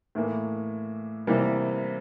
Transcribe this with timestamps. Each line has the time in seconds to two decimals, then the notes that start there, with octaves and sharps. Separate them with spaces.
0.15 A2 E3 A#3
1.27 C3 E3 G3 A#3